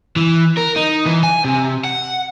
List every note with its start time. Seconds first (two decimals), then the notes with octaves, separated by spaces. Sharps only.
0.16 E3
0.57 A#4
0.76 D#4
1.06 E3
1.24 G#5
1.45 C3
1.84 F#5